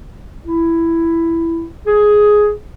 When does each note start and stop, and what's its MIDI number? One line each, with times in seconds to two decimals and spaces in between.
0.46 1.67 64
1.87 2.52 68